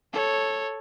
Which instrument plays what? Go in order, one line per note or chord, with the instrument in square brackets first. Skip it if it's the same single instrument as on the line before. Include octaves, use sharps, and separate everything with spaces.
[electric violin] A4 C#5